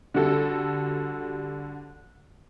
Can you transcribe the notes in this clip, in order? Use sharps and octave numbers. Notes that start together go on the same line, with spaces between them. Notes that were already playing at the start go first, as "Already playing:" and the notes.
D3 G3 F#4 A4